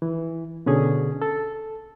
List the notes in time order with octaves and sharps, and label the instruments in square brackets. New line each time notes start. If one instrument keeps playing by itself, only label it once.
[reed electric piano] E3
B2 D3 C#4 G#4
A4